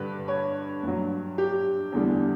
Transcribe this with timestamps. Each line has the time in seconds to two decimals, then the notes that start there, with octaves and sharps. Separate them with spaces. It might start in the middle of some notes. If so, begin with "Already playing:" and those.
Already playing: G2 D3 G3 B4
0.28 C#5
0.83 G2 F#3
1.38 G4
1.92 E2 D3 G3